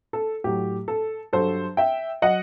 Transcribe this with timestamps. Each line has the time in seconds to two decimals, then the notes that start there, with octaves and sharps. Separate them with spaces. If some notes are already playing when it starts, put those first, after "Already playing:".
0.13 A4
0.44 A2 F#3 G4
0.88 A4
1.33 G2 F#3 A4 C5
1.77 E5 G5
2.22 F#3 D#5 F#5